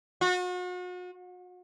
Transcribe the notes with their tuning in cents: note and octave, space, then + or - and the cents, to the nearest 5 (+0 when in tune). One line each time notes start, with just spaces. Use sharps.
F#4 -40